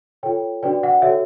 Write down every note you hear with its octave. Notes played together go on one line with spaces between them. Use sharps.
F4 A4 C#5 G5
D4 F#4 B4 D5 G5
F#5
F#4 A4 C#5 E5